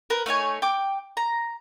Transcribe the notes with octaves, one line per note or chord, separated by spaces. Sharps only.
A#4 B4
A3 D#4 C#5 G#5
G5 D6
A#5